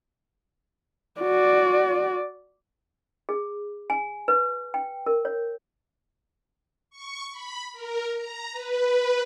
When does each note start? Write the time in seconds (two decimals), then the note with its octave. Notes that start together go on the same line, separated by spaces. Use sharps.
1.21 F#4 D5
3.29 G#4
3.90 G#5
4.28 B4
4.74 G5
5.06 A#4
5.25 C#5
6.90 C#6
7.31 B5
7.72 A#4
8.14 A#5
8.52 B4